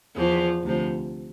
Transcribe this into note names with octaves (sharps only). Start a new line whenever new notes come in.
E2 E3 F3
D2 C3 F3